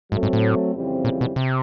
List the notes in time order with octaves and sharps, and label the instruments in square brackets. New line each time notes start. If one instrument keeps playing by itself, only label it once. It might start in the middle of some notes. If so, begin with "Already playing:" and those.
[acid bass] G#2 [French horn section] F#3 A3 C4
[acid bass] G#2
A2
[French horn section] F2 C#3 E3 G3 C4
[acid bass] A#2
B2
C3